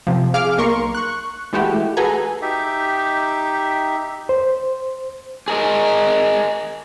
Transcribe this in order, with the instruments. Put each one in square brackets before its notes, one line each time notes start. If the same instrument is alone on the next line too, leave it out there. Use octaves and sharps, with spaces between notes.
[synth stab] C3 F3
G#4 F5 D6 F6
B1 A#3 A#4 C6 C#6
C#6 F#6
E3 G#3 A3 E4 F#4 G4
F#4 G#4 A4 B4 G#5 A#5
[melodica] D#4 G4 E5
[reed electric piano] C5
[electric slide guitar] G#4 A#4 D#5